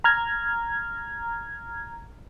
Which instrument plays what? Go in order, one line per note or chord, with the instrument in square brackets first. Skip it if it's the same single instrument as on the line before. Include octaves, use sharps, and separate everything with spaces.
[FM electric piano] A#5 F6 G#6